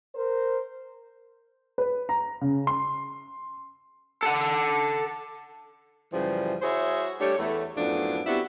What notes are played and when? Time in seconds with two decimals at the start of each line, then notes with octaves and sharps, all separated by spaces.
0.15 A#4 C5
1.78 B4
2.09 A#5
2.41 C#3
2.67 C6
4.23 A4 F#5
6.12 F#2 C#3 E3 F3 G3
6.62 E4 F#4 G#4 C5 C#5 E5
7.20 G3 A3 D4 G4 C#5
7.38 E2 A3
7.76 F#2 A2 F3 A3 B3 D4
8.26 B3 C4 D4 E4 F#4 G4